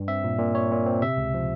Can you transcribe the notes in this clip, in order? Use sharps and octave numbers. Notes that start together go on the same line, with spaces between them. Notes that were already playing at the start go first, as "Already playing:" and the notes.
Already playing: G2
C4 E5
A#2
A#2
A#2 C#5
A#2
C4
C3 E5
C#2
F3